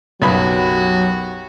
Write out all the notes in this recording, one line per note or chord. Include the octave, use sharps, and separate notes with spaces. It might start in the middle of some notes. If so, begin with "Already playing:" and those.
B1 F#2 F#3 B3 F#4 G4 B5